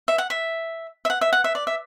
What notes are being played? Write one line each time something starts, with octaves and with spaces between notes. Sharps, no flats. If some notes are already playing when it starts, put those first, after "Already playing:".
E5
F#5
E5
E5
F#5
E5
F#5
E5
D5
E5